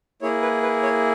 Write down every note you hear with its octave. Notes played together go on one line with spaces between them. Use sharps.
A#3 E4 G#4 C#5
B4
B4
C#5